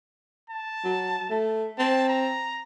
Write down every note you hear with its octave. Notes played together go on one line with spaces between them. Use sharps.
A5
F#3
A3
C4 A5
A#5